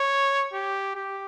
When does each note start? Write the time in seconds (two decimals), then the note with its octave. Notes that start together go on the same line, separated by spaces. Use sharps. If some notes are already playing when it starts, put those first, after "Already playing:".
Already playing: C#5
0.53 G4
0.95 G4